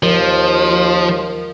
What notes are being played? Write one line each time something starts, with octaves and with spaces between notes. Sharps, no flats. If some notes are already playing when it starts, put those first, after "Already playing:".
D#2 F3